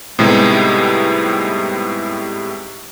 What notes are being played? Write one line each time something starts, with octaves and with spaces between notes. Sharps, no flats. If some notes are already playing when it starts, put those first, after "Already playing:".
A2 C3 G3 G#3 B3 D#4